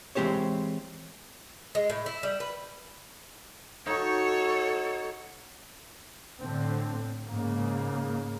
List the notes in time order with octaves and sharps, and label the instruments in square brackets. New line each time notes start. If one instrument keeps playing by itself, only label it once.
[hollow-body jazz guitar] E3 G#3 C4 G4 C5 C#5
[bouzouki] G#3
A2
E4
G3
B4
[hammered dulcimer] D#4 F#4 [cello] A4 C#5
[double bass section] A2 D3 C4
G#2 C#3 A#3